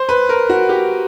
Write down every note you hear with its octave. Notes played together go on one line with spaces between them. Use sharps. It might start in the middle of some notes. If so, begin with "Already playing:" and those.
Already playing: C5
B4
A#4
F#4
G4